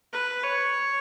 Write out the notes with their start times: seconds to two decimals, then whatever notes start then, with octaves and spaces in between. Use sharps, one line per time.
0.13 B4
0.43 C#5